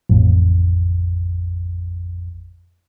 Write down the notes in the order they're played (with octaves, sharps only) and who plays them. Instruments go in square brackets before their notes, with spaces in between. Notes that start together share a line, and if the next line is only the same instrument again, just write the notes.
[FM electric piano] A1 F2